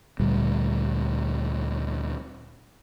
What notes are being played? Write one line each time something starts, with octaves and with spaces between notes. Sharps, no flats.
D2 A#2 G3